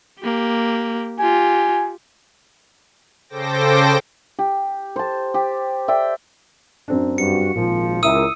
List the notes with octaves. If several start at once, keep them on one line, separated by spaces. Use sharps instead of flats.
A#3 G4
F4 G4 G#5
C#3 A4 C5 G5 D6 A#6
G4
C5 A5
G4
D5 E5 G5
F#2 C4 D4
G2 F#4 C#7
G#1 A#2 F3
C#2 E4 A#4 E5 D#6 E6 D#7